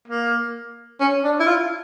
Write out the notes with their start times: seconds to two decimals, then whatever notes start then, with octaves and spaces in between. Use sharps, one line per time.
0.08 A#3
1.00 C#4
1.24 D4
1.40 E4
1.47 F4